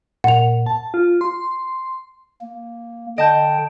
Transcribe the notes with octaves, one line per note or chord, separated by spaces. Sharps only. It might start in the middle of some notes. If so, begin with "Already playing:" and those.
A#2 F#5 F7
A5
F4
C6
A#3
D3 D#5 G5 A5 G6